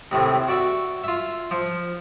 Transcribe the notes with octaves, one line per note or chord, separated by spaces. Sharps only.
D#2 A2 C3
F#4 D5 E5
F4 E5
F3